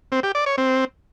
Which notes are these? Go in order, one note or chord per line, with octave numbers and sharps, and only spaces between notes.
C4
G4
D5
C#5
C4